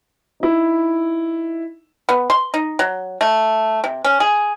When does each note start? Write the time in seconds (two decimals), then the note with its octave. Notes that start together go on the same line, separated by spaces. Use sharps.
0.40 D#4 E4
2.09 B3
2.30 C6
2.54 D#4
2.79 F#3
3.21 A3
3.84 C3
4.04 C#4
4.20 G#4